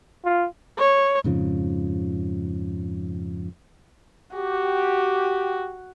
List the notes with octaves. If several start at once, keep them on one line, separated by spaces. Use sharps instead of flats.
F4
C#5
F2 G#2 C#3 F3
F#4 G4